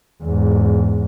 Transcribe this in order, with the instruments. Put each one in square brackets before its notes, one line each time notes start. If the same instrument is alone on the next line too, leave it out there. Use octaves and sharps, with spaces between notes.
[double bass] E2 G#2